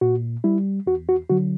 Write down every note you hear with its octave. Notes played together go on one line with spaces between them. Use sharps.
A#2 F#4
G3 E4
E2 F#4
F#4
D3 F#3 F#4